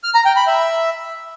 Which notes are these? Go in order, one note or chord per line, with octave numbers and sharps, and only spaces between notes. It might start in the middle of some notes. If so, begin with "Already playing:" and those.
F6
A#5
G5
B5
E5